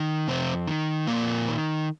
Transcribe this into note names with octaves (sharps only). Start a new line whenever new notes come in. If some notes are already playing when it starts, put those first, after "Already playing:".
Already playing: D#3
F2 C3 C4
D#3
F2 A#2 A#3
D#3